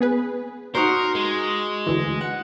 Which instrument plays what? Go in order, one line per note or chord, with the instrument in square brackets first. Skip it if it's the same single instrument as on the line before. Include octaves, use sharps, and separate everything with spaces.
[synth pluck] B3 G#4 B4
[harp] D#4 F#4 C5 [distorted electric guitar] A#4
[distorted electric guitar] G#3
[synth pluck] D2 E3
[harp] F#5